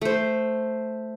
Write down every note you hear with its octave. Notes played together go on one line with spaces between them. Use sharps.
A3 C5